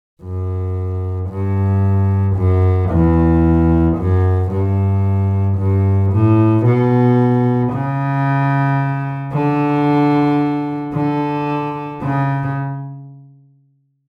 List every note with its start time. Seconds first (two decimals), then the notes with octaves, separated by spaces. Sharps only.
0.23 F#2
1.30 G2
2.36 F#2
2.90 E2
3.97 F#2
4.51 G2
5.58 G2
6.12 A2
6.65 B2
7.73 C#3
9.33 D3
10.93 D3
12.02 C#3